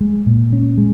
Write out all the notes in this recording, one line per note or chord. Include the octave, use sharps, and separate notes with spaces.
G#3
A#2
C#4
G#3